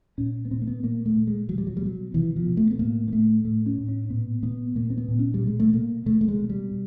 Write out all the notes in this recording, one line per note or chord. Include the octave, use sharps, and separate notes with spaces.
A#2 C#4
B3
A#2 C4
A#3
B3
A#2 A#3
A3
A#2
G#3
B2 F#3
G3
F#3
G3
B2 F#3
B2 E3
F3
B2
A3
B3
A2 A#3
A#3
A2 A3
A2 A3
C#4
A2
C#4
A#2 B3
A#2 B3
A#2 A#3
C4
B3
A#2
C#4
G3
B2
G#3
A3
B2 A#3
B2 A3
A3
G#3
B2
G3
B2